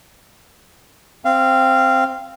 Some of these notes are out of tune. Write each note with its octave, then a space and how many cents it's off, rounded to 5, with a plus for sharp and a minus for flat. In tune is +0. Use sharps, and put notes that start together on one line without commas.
C4 +0 F5 -20